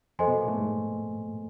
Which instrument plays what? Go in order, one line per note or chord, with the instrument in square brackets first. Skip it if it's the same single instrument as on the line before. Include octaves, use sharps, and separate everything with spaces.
[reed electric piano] F2 F3 [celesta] A4 C5 D#5 G#5 C6
[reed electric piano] B2 B3
A#2 A#3
A2 A3
G#2 G#3